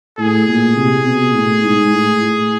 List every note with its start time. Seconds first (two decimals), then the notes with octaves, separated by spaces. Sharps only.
0.19 A2 G#4
0.48 A#2
0.77 C3
1.06 B2
1.34 A2
1.64 G#2
1.93 A2
2.22 A2